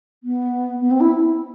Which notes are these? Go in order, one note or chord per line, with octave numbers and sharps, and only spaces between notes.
B3
B3
C4
E4